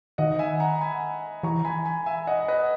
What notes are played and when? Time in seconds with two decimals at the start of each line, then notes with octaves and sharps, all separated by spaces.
0.18 D#3 D#5 F#5
0.39 E5 G#5
0.60 F#5 A#5
0.81 G#5 B5
1.43 E3 A#5 C#6
1.65 G#5 B5
1.86 G#5 B5
2.06 E5 G#5
2.27 D#5 F#5
2.48 B4 D#5